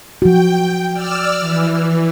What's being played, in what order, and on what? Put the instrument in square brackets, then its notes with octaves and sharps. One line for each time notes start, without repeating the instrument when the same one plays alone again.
[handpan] F3 F#4 [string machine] G5
[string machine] D5 E6 F6
E3